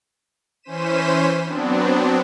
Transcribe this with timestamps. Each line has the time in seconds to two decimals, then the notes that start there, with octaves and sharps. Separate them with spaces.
0.62 E3 C#4 C5 B6 D#7 E7
1.43 F#3 B3 C4 D4